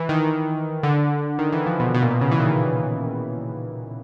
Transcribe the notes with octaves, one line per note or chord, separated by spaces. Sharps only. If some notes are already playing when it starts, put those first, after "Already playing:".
Already playing: E3
D#3
D3
D#3
E3
F3
B2
B2
A#2
B2
C#3
E3
D#3